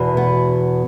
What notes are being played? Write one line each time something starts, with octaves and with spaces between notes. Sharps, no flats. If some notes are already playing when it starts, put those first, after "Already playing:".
Already playing: E2 B2
B3